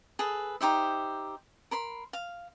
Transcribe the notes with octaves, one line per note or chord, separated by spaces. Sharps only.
G#4 A4 B4
D#4 G4 C5 E5
A#4 B5 C6
F5